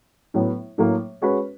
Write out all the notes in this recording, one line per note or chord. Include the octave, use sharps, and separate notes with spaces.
A2 F#3 B3 E4
A2 F#3 A#3
G#3 C#4 F#4 B4